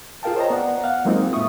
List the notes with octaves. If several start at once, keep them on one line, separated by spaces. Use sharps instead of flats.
F4 G#4 A#4 F5 G5 A5
C5 C#5 D#5 A#5
B3 D5 F#5
F5 F#5
F#3 G#3 A#3 C4 D#4 F4
A2 A#3 E4 E5 C#6 D#6